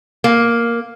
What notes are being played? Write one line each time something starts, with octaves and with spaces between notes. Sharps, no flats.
A#3